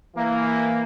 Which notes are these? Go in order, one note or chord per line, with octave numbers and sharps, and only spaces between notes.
E3 A#3